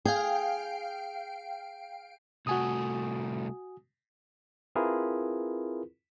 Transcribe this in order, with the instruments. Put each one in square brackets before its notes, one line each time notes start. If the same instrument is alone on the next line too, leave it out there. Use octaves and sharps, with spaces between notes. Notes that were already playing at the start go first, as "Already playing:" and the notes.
[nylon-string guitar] G#4 [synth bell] F5 G5
[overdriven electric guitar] C2 A3 [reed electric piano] F#4 G#5 D#6
[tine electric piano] C4 E4 F4 G#4 A#4 B4